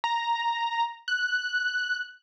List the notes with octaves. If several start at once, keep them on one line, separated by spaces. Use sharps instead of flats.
A#5
F#6